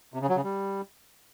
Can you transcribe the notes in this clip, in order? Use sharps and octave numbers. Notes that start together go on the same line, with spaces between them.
C3
C#3
F#3
C#3
G3